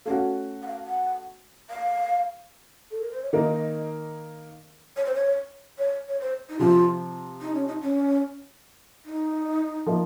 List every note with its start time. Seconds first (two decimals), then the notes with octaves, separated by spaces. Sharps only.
0.05 A3 C#4 F#4 F5
0.62 F#5
0.67 F5
0.87 F#5
1.70 F5
2.91 A4
3.01 A#4
3.11 C5
3.22 C#5
3.32 D#3 A#3 D#4 A#4 D#5
4.97 C#5
5.05 C5
5.15 C#5
5.78 C#5
6.08 C#5
6.19 C5
6.49 D#4
6.59 C3 F3 C4 F4
7.41 D#4
7.55 C#4
7.68 D#4
7.82 C#4
9.06 D#4
9.86 F3 A#3 D#4